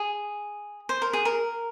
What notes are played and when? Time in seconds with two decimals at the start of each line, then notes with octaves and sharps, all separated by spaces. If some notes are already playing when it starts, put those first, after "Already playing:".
Already playing: G#4
0.89 C5
1.02 A#4
1.13 G#4
1.25 A#4